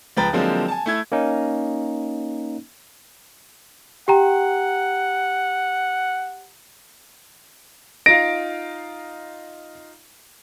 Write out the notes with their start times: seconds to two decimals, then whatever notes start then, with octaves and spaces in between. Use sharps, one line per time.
0.17 C#2 F3 B4 G5 A#5 A6
0.33 D3 F3 F#3 G#3 A#3 C4
0.68 G#5 A5
0.86 A3 E4 G#6
1.12 A#3 C#4 D#4
4.08 G4 F#5 G5 A#5
8.06 D#4 F4 F5 A#6 D7